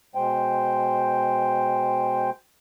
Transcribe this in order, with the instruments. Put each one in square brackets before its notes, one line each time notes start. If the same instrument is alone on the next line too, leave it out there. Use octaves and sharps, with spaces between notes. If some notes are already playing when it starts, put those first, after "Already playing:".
[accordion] B2 G#3 C5 G5